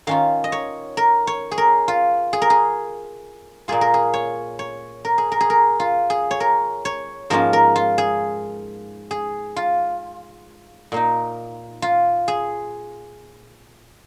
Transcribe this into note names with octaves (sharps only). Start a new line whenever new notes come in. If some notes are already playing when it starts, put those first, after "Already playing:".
D#3 C#4 F4 F5
D#5
C#5
A#4
C#5
G#4
A#4
F4
G#4
A#4
G#4
A#2 A#3 F4 G#4
A#4
G#4
C#5
C#5
A#4
G#4
A#4
G#4
A#4
F4
G#4
C#5
A#4
C#5
G#2 F3 A#3 C#4 F4 A#4
A#4
F4
G#4
G#4
F4
A#2 A#3 D#4
F4
G#4